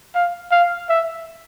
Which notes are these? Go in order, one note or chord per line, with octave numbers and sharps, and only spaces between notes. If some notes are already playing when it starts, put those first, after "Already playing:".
F5
F5
E5